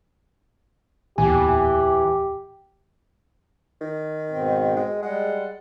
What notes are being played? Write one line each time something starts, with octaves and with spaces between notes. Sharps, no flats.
D1 E2 A#2 E3 G4 G#5
D#3
G#2 B2 C4
G#3
G3 G#3 F#5